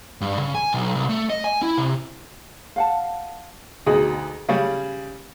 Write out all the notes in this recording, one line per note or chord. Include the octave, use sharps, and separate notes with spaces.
G2
C#3
G#5
B1
C2
A3
D#5
G#5
E4
C3
F5 F#5 A5
D2 B2 D#4 G#4
C#3 G3 C#4